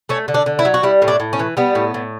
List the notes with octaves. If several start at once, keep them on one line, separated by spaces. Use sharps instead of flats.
A3 C#4
D3
D4
D3
E4
F#3
F#4
G3 E4
A2
D4
A2
C#4
E3
G3 B3
A2
A2